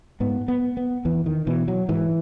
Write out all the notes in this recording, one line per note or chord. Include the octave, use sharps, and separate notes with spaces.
G#2 B3
B3
B3
E2 E3
D#3
B2 E3
F#3
G#2 E3